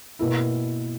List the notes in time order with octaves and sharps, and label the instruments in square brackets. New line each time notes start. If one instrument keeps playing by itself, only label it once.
[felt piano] B2 A#3 E4